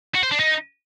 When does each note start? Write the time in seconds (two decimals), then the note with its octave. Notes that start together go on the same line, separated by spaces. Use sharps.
0.15 F#4
0.23 C5
0.31 D4
0.39 D#4